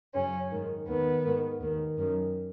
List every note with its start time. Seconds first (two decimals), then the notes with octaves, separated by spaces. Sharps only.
0.14 F#2 C#3 C#4
0.50 G#2 D#3
0.87 D#2 D#3 B3
1.24 G#2 D#3
1.60 D#2 D#3
1.97 F#2 D#3